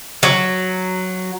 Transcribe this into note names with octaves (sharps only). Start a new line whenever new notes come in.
F#3